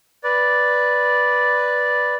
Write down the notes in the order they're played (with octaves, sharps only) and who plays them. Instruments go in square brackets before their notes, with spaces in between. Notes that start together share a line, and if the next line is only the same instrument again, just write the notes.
[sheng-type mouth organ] B4 D5